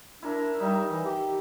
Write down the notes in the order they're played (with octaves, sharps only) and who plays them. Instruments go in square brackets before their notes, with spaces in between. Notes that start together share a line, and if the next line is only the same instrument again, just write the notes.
[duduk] D4 [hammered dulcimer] E4 A#4 E5
[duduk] G3 [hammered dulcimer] D#4 E5
[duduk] E3
G4